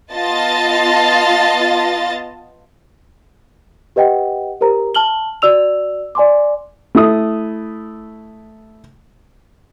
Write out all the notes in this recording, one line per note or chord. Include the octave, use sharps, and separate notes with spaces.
B3 F4 D#5 A5 A6
G4 B4 D#5 F#5 G5
G4 A#4 C5 A#5
A5 F6 F#7 G7
F#4 D5 E6 F7
D5 G#5 C6 D6
A3 E4 D#6